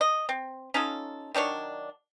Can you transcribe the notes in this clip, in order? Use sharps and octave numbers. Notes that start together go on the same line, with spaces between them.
D#5
C4
C#4 D#4 F4 A4
D#3 F#3 D4 C#5